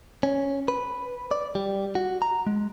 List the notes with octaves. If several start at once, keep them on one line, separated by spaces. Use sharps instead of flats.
C#4
B4
D5
G3
F#4
A#5
G#3